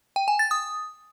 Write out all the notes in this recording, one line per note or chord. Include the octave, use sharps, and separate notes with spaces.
G5
G#5
A6
D#6